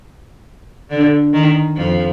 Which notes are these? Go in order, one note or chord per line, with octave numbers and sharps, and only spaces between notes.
D3
D#3
F2 F3